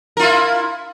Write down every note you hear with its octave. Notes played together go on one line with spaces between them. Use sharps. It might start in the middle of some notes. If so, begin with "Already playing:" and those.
E4 F4 A#4